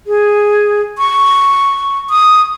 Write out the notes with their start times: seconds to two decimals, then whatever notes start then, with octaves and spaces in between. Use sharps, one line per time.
0.07 G#4
0.98 C#6
2.10 D#6